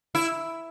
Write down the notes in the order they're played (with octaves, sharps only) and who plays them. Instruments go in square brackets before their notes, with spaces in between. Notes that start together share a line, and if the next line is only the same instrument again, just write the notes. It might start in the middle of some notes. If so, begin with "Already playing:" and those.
[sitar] E4